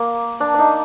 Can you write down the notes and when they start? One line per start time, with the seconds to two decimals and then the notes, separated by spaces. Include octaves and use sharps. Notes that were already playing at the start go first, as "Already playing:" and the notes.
Already playing: A#3
0.40 D4
0.54 D4 D#4